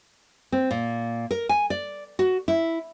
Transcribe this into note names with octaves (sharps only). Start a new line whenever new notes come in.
C4
A#2
A#4
G#5
D5
F#4
E4